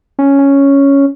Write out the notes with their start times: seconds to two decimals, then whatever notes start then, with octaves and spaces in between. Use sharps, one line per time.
0.19 C#4
0.39 C#4